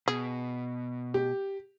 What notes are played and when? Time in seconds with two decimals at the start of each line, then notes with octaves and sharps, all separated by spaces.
0.08 B2 G#4
1.14 G4